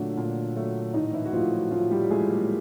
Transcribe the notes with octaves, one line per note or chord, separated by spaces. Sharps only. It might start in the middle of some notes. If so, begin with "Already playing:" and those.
Already playing: A#2 D3 F#3 A3 D4
A#2
F#3 A3
A2 D#3 D#4
E3 E4
F#4
E3 F3 A3 F4
F#3 F#4
A2 F3 F4
G3 G4
E3 G#3 A3 G#4
A#3 A#4